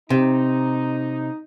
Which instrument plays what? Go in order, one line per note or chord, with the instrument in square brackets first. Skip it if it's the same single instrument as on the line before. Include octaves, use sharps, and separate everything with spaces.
[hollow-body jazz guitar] C3 [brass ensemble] D#4